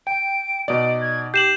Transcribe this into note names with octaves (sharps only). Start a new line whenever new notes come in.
G5 D7
B2 D#4 D5 D7
G#6
G4 G6 C7 E7 F#7